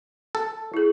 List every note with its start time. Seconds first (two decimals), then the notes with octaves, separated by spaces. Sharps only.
0.35 A4
0.74 E4 G#4